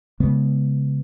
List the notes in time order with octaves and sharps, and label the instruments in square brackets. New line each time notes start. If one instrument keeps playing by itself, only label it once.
[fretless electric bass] C#3 G#3 B3